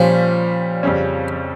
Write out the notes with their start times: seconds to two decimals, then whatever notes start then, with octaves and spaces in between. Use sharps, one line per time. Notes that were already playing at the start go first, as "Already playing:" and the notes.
Already playing: A#2 F3 G3 C#4
0.83 F2 C#3 G3 C#4